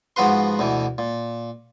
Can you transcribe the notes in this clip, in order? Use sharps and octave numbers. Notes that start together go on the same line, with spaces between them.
G#2 F3 B3 F#4 B4 C6
D2 B2 E3
A#2